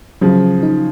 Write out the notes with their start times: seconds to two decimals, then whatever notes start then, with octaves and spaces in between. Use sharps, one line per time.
0.21 C#3 F3 F#3
0.63 D#4